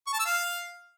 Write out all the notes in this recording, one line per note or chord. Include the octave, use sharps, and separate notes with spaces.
C#6
A5
E6
F5